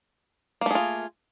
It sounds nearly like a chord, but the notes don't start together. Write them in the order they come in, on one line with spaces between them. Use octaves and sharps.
A#3 A3 G#4 F4